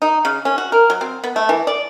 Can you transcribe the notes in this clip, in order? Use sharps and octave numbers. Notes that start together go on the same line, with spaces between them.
D#4
C#3
C#4
F#4
A#4
F#3
C4
B3
A3
E3
D5